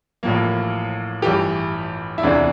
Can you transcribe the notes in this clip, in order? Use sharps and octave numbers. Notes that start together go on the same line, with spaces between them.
A1 A2 F3 A#3
A1 G2 E3 G4
E4
E1 D2 C3 E3 D4